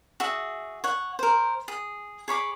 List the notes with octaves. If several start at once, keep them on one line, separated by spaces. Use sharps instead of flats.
F#4 G#4 E5
C#5 F#5
A#4 C5
G#4
G#4 C#5 B5 D6